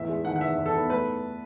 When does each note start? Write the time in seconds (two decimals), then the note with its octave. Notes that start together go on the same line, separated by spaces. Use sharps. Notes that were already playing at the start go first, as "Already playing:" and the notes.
Already playing: E2 A2 E5
0.09 G#3
0.25 D#3 F#5
0.36 F#5
0.41 E2 E5
0.58 E2
0.66 A4
0.74 B3
0.90 A3 B4